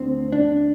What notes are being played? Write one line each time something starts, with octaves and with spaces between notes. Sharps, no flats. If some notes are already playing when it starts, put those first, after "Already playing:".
Already playing: D2 D3 C4
D4